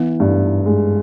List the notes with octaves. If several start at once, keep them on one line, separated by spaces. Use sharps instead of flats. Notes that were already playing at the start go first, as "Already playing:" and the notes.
Already playing: E3 B3
G2
G#3